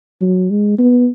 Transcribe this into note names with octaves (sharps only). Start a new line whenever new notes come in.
F#3
G#3
B3